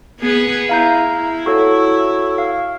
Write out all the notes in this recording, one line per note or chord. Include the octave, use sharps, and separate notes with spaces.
B3 G#4 B4
E4 F5 A#5 G6
E4
F#4 A4 C#5
F5